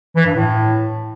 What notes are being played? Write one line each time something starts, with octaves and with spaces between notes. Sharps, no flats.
E3
G2
A2